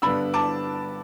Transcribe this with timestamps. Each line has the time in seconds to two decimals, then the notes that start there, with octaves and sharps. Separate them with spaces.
0.02 G2 D3 B3 D4 B5 E6
0.34 A5 D6